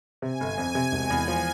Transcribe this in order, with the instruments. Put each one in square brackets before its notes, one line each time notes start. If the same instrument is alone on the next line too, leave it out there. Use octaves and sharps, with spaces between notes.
[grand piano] C3 [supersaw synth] G#5
[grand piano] G1
F2
C3
E1
E2
F3